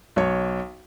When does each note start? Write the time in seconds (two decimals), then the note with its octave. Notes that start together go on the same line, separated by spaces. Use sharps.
0.16 B1 C#5